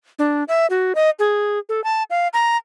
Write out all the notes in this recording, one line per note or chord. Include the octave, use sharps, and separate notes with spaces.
D4
E5
F#4
D#5
G#4
A4
A5
F5
A#5